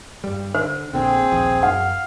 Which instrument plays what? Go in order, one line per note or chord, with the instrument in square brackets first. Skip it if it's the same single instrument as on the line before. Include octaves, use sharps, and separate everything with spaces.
[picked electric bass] G2 G3
[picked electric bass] D3 [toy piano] C5
[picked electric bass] A#1 A#2 D3 [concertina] C4 [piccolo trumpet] G#4
[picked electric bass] A#1 D#2 F3
[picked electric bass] F#2 [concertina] F5 [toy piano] F#5